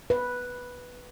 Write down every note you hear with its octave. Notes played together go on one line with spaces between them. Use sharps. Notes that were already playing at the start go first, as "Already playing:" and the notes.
B4